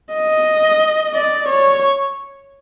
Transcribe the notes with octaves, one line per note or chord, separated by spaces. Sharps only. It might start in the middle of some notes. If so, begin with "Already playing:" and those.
D#5
D5
C#5